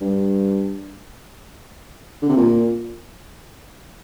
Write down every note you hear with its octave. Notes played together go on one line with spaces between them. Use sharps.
G2
D3
C3
A#2